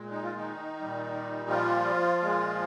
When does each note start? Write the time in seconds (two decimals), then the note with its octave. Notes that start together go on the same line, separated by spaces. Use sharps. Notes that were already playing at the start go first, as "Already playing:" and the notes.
Already playing: A#2 G#3
0.11 D#4
0.23 F4
0.36 D#3 D#4
0.80 A#2 G3
1.49 F3 F4
2.20 A#2 G#3